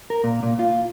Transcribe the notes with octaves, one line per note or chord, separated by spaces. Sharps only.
A#4
A#2
A#2
F4